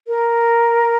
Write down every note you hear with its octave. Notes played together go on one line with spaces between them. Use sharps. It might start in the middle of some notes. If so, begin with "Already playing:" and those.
A#4